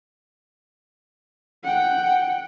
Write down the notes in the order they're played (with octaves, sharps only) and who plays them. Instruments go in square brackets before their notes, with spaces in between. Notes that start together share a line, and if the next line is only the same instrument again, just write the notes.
[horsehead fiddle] F#5 G5